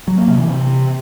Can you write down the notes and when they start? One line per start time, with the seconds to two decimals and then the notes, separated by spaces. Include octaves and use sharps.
0.08 F#3
0.18 A#3
0.28 C3
0.38 E3
0.48 C3